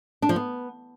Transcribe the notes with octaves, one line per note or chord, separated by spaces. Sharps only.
D4
F3
B3